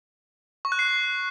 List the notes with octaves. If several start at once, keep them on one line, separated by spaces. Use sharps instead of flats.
C#6
F#6
C7